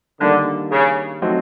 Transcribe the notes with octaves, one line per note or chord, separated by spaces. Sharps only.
D3 D#3 G3 A#3 D4
C#3
F#3 A3 C4 D#4 F#4